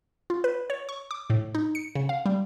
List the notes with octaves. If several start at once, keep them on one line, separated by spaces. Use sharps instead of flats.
F4
B4
C#5
C#6
D6
A2
D#4
C#7
C#3
F5
G3